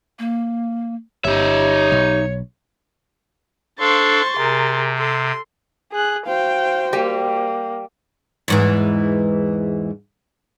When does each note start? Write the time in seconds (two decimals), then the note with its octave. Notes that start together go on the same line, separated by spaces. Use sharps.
0.19 A#3
1.25 G1 D#4 G4 C#5 E5
1.92 B1
3.80 D4 A4 C5 F5 C6 C#6 A6
4.37 C3 G#4 A#4
4.98 A4 C6
5.92 G#4 F#6
6.27 F#4 C5 F5 G5
6.93 G3 A#3 G4 G5
8.48 E2 G#2 E3